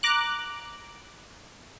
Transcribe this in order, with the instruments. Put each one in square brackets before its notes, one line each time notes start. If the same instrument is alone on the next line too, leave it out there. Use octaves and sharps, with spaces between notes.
[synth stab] A#5 D6 F#6